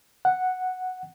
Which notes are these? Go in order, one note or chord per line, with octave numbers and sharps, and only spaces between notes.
F#5